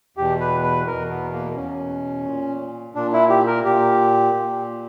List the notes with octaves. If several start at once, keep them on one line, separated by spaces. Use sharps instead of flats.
E2 B2 G4
B4
B4
E2 B2 A#4
B3
A#3
E2 B2 C#4
A#2
A#2 D4
E4
G4
A#4
A#2 G4
A#2